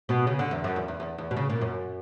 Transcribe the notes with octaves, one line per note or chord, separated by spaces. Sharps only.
B2
C#3
D3
E2
F#2
E2
E2
E2
E2
B2
C#3
A#2
F#2